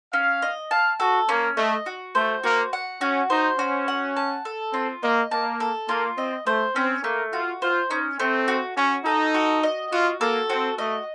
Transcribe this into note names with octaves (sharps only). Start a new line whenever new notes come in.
C#4 F5
D#5
F5 A5
F#4 A4
A#3 C#4
A3 D#5
F#4
A3 C5
A#3 F#4
F#5
C#4 F#4
D#4 C5
C#4 F#4
F#5
A5
A4
C4 F4
A#3 D#5
A#3 A5
A4
A#3 F4
C4 D#5
A3 C5
C4 C#4
A3 A#3
F4 F#4
F4 C5
C#4 D#4
A3 C4
F#4
C#4 F#4
D#4 A4
F#4
D#5
F4 F#4
A#3 A4
C4 F#4
A3 D#5